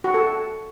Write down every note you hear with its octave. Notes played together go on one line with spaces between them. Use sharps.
F#4
A4